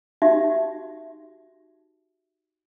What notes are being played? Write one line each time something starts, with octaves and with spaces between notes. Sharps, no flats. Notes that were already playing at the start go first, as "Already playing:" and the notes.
D#4 F#4 G4 E5